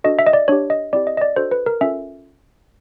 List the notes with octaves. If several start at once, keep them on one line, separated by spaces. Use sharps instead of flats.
D4 F#4 A4 D#5
E5
D#5
D5
D4 G4 C#5
D#5
C4 E4 G4 D5
D#5
D#5
D5
D4 F#4 A4 C5
B4
A#4
C#4 F4 A4 E5